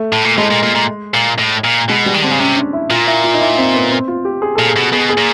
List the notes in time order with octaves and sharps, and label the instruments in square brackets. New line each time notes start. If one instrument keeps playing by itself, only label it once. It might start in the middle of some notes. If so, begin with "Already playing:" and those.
Already playing: [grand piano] A3
[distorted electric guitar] A2
A#2
[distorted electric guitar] A2 [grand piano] G#3
[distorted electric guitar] A#2
A#2
A#2
A#2
A2
A#2
[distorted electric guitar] B2 [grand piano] G#3
[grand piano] G3
[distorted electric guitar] D#3
[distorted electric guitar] D3 [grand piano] C4
[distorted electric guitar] C#3
[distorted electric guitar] C3 [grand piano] C#4
[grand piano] D4
E4
[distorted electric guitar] A#2 [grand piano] F4
[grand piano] E4
F4
D#4
E4
C4
B3
C4
F4
G4
G#4
[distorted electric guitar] A#2 [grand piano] A4
[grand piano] G#4
[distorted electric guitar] B2
[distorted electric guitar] B2 [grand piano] G#4
[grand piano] G#4
[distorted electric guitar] A#2